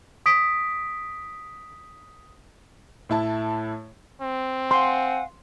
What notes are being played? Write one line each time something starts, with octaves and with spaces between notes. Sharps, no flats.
D#6 B6 D7
A2 E4 A5
C4
F5 F#5 G#5 C6